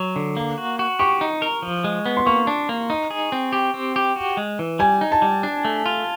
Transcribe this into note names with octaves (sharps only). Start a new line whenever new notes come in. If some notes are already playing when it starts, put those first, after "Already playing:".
Already playing: F#3
D3
A#3
F#4
F#4
G4 C#6
D#4
A#4
F3
G#3
B3
C6
A#3 C#6
D4
A#3
D#4
G#4
C4
G4
C4
G4
F#4
G#3
E3
G3 G#5
D#4
A5
G3
D4
A3
F4